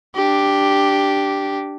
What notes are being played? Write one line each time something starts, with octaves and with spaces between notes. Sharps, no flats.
D4 G4